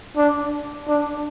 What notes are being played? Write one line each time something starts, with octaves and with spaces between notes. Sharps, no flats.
D4
D4